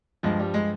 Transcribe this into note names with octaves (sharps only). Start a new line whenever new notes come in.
G2 F3 G#3
G3
G#3